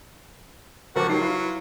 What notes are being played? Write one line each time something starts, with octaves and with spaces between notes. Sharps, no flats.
C#2 F3 F#4 A#4 D6
F#3 D#4 G4 C7
E4 F4 B4